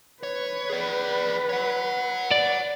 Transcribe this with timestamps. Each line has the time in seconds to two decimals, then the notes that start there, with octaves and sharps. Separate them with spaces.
0.23 B4 C#5
0.70 G#4 D5
1.49 C#5 F#5
2.31 D5